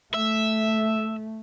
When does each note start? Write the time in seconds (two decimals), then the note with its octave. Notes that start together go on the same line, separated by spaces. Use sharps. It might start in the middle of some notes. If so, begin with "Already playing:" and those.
0.14 A3 E5